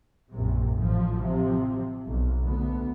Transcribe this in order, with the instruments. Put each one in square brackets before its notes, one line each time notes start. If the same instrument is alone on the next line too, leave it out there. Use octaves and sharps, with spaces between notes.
[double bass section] A#1 F#2 C3
A1 F3
C3 F3
B1
D2 B3